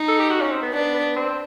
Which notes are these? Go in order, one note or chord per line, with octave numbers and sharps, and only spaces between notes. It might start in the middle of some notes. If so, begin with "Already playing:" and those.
Already playing: D#4
A4
G4
F#4
C#4
C4
B3
B3 D4
B3
C4